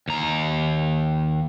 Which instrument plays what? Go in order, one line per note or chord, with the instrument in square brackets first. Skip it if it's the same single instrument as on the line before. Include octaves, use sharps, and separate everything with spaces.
[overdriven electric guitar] D#2 A#5